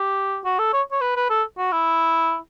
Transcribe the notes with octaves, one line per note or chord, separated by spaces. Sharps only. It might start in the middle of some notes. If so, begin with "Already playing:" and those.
Already playing: G4
F#4
A4
C#5
C#5
B4
B4
A4
F#4
E4